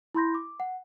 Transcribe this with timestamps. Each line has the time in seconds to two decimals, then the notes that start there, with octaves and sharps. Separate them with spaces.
0.15 E4 B5 C6 G6 A#6
0.34 D6
0.60 F#5